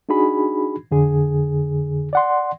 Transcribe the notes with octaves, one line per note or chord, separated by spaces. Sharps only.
D4 D#4 F#4 G#4 B5
F2 D3 G#4
D5 F#5 C6